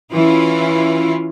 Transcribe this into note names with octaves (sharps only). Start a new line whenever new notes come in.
E3 C#4 E4 F4